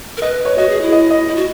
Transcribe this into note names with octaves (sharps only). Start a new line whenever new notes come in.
A#4
B4 D#5
C#5
F#4 D#5
G#4
E4
D#5
D#5
E4
F#4